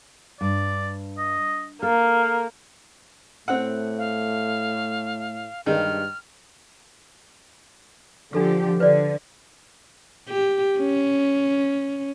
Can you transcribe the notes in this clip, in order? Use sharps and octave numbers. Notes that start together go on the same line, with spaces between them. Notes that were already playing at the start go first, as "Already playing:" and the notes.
G2 D5
D#5
A#3 A4 F5
A2 A3 C4 F#5
F5
G2 D#3 G#3 F6
D3 F3 D4 G4 A4 E6
D3 B4 C5 D5
G4
C#4